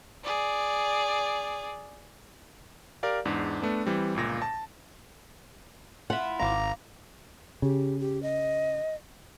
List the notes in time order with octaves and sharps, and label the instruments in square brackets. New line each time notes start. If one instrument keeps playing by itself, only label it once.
[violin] G#4 D5
[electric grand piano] G4 A#4 D5 F5
E2 G#2 D4
A3 B3 D4
E3 G3 C4
G1 C#2 A#2 A#6
A5
[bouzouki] E4 F4 [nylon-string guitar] F#5
[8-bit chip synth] G#1 A#5 [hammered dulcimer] F5 D6
[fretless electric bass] C#3 [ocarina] G4
[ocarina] G4
D#5